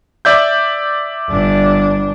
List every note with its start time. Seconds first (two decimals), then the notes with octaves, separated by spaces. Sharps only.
0.25 D5 E5 G6
1.30 G1 D4